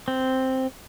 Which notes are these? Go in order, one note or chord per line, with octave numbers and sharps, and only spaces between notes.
C4